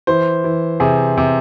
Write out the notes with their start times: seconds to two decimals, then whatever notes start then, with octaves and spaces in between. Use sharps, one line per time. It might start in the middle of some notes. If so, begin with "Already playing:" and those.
0.07 E3 C5
0.44 E3
0.80 C3 G#4
1.17 C3